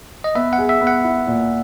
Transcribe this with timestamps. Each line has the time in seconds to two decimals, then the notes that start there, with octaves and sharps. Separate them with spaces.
0.24 D#5
0.35 B3 E5
0.53 F#5
0.58 G#4
0.69 E5
0.81 B3
0.87 F#5
1.04 E4
1.27 A#2